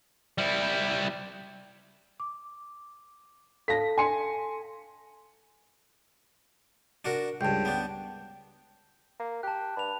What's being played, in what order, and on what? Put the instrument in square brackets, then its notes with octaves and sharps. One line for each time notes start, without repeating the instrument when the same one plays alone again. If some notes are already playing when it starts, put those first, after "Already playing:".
[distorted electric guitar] G3 E4
[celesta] D6
[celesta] A4 F5 A5 [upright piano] A#6 B6
[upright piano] G#5 C6 C#7
[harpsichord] D4 F#4 A#4
[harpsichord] C#2 G2 [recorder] G5 [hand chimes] A5 G6
[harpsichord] B3 D4
[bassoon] A#3
[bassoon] G4 [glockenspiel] A5 F#6
[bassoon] G2 [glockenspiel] B5 F7